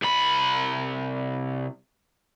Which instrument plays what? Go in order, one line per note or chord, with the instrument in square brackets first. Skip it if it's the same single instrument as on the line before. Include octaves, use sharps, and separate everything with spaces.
[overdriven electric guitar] C2 B5